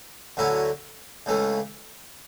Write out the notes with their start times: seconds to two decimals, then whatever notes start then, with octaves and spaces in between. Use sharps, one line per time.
0.37 D2 D3 F#3 C#4 E4
1.26 C#2 C#3 E3 A3